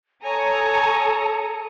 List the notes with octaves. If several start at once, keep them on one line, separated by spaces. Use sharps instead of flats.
A4 C#5 G#5 A#5 D#6 C#7